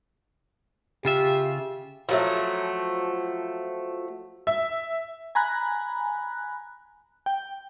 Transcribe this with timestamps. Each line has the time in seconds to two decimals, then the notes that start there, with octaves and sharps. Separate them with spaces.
1.05 C#3 F4 G4 E5
2.09 F3 F#3 A3
4.47 E5
5.35 G#5 A#5 B5 F#6
7.26 G5